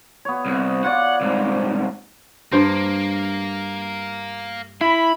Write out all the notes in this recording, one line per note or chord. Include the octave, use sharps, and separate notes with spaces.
B3 C#5
C2
F4 C#5 D5 F#5
C2 G#2
G2 A#3 C5
E4 B5